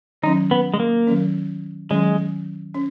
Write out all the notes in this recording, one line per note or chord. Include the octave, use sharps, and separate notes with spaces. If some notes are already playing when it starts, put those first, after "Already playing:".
D#3 F#3 C#4 D#4
B3
G#3
A#3
D#3 F#3 C#4
D#3 F#3 G#3 C#4
C#4